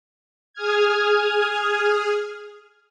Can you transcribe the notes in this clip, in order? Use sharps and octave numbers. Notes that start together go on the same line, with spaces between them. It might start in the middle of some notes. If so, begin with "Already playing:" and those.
G#4 D#6 F6 G#6